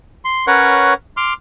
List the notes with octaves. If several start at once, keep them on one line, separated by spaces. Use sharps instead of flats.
C6
C#4 A#4 B4 C#5 F#5 C#6
C6 D6 F6